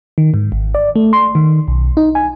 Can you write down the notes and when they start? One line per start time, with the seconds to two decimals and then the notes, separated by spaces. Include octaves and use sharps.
0.18 D#3
0.34 G#2
0.52 G#1
0.75 D5
0.96 A3
1.13 C6
1.35 D#3
1.68 B1
1.97 D#4
2.15 G#5